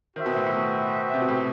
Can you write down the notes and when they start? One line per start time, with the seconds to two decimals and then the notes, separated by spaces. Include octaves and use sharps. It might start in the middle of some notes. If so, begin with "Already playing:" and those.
0.16 D#3 F#4 C5 E5 G5
0.26 B2
0.36 A2
0.46 A2
0.57 B2
1.14 C3
1.22 B2
1.28 A2